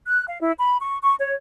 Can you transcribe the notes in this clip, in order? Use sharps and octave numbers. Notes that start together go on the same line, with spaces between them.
F#6
F5
E4
B5
C#6
C#6
C#5